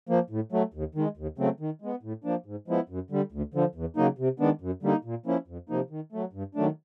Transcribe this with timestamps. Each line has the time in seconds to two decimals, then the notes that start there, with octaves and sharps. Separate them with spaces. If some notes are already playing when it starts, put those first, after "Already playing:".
0.09 F3 A#3
0.30 A2
0.52 F#3 A3
0.74 D#2
0.95 D#3 G#3
1.17 D#2
1.38 C#3 F#3 A3 C4
1.60 D#3
1.82 G#3 B3
2.03 A2
2.24 F3 A#3 D4
2.46 G#2
2.68 F3 G#3 B3 E4
2.89 F#2
3.11 D3 G3
3.32 D2
3.54 D3 F3
3.75 E2
3.96 C#3 F#3 A#3 D#4
4.18 C3
4.40 D#3 G#3 B3 D4
4.61 F#2
4.83 D3 G3 A#3 D#4
5.05 A#2
5.26 F3 A#3 C#4 E4
5.48 F2
5.69 C3 F3 A#3 D#4
5.90 D#3
6.12 F#3 A3
6.33 G2
6.55 D#3 F#3 A3 D4